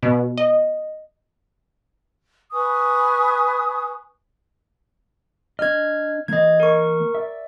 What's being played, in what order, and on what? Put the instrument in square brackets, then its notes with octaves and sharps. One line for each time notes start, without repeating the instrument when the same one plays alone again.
[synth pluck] B2
D#5
[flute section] B4 G#5 C#6 D#6
[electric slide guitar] D4 D#5 [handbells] F6 G#6
[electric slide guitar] E3 A#3 [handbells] D#5 G#6
[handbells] A#4 C#6
[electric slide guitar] D5 E5